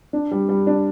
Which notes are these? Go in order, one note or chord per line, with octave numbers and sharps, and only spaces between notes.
D4
G3
G3
D4